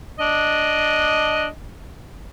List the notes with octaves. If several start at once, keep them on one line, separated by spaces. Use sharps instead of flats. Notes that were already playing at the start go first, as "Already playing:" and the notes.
D4 D#5